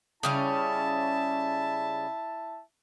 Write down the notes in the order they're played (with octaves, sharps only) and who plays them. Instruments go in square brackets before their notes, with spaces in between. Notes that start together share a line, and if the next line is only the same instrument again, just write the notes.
[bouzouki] C#3 G3 C#4 [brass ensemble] E4 E5 A5